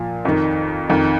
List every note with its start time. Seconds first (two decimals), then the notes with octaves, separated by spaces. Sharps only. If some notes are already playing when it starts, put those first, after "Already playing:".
Already playing: A#2 F3
0.25 F2 D#3
0.89 F2 D#3